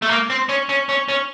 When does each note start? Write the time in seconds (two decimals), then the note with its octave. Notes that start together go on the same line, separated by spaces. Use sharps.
0.02 A3
0.10 A#3
0.30 C4
0.49 C#4
0.69 C#4
0.89 C#4
1.09 C#4